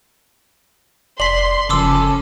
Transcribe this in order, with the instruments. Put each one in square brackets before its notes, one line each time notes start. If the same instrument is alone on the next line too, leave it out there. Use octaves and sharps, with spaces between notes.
[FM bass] F1 [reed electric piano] D5 [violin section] C6 [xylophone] B6 F#7
[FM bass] F1 [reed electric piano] C#3 F3 [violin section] C#4 A4 [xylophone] B5 D6 E6